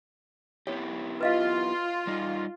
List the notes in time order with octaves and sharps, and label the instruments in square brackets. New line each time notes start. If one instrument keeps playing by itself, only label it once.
[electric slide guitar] B3 E4 G4 [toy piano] C#5
[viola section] F4 [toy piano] B4 D#5 F5
[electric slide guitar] G3 D#4